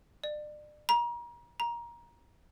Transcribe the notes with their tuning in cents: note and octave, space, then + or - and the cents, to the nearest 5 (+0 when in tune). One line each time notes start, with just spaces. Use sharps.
D5 +35
A#5 +35
A#5 +20